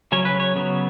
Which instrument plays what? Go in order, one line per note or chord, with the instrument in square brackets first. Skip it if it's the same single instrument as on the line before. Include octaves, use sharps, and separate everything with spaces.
[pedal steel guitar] C#3 F#3 C#4 C#5
B4
C#5
C#3 F#3 B3